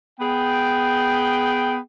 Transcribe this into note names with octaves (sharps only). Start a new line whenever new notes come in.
B3 G#4 G5